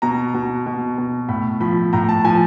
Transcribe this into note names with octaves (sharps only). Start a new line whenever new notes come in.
B2 A#5
B2
B2
B2
A2 B5
F3 B5
A2 A#5
A5
F3 G#5